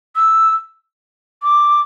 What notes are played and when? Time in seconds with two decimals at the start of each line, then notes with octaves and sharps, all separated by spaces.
0.16 E6
1.43 D6